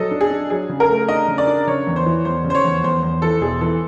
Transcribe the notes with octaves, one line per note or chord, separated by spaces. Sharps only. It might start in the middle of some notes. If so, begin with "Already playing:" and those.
Already playing: F#3 A4 D#5
D4
G#4
D4
F#3 G#4
C#3
A#4
A3
D4 D#5
C#3
D5
D4
C#3 C#5
E2
C5
E3
E2 C5
C#3
C5
C#5
E2
E2 C5
E2
E3 A4
E1 G#4
E3 A4